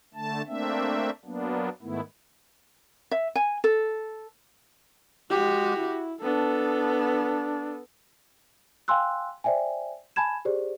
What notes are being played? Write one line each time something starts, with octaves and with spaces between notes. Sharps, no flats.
D3 A3 A5
A3 A#3 C4 D4 E5
F#3 A#3 B3 D4
G#2 D#3 A3 B3 E4
E5
G#5
A4
G#3 F#4 G4
E4
B3 D4 A4
F5 G5 G#5 C6 E6 F#6
C5 D5 E5 G5 G#5
G#5 A5 B5 G#6 E7
G4 G#4 C5 D5